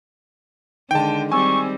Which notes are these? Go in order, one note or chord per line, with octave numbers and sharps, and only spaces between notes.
D3 D#3 G#3 G5 A5
G3 C4 G#5 C#6 E6